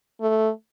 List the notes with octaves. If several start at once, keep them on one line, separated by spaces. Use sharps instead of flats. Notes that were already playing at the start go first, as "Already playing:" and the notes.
A3